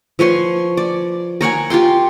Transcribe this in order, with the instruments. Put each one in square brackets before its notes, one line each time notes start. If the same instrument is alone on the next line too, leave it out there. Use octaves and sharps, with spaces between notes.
[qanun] F3 B4 C#5 C6
D5
A#4 C#5 F#5 G#5
F4 G4 G5 C6